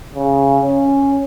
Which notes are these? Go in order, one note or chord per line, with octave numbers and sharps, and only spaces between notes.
C#3
C#4